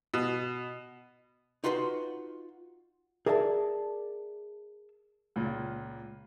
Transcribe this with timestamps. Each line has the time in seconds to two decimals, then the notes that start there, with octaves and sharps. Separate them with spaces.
0.14 B2
1.64 D#4 F4 F#4 B4 A#5 C6
3.26 G#4 A#4 D5 E5 F#5 A5
5.36 C#2 A#2